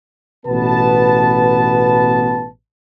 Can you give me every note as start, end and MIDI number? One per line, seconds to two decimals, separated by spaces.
0.46 2.47 33
0.46 2.47 47
0.46 2.47 59
0.46 2.47 71
0.46 2.47 81